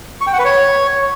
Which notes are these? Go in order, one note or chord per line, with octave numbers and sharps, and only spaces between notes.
C#6
G5
F#5
B4
C#5